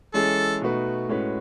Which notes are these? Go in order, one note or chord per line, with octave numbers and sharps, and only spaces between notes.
E3 G#3 C#4 G#4 A4
B2 A3 D#4 F#4 B4
A2 G#3 C#4 F#4 B4